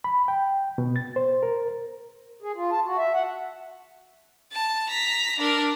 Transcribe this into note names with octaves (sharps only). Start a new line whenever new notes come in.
B5
G5
B2
A6
C5
A#4
G#4
F4
A5
F#4
E5
F#5
A5
A#5 B6
D4 A#4